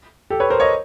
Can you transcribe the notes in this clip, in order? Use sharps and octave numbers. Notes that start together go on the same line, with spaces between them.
G4 A4
B4 C#5
A#4 C5
C#5 D#5